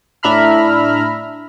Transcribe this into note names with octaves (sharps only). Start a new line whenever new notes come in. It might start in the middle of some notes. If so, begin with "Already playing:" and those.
A2 D4 E5 A#5 B5 F6